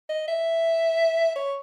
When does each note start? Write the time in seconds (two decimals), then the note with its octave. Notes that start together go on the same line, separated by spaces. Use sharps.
0.10 D#5
0.28 E5
1.36 C#5